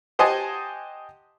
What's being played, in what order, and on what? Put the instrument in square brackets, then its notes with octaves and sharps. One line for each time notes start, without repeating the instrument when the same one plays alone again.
[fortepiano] G4 C5 D#5 F#5 G#5 A5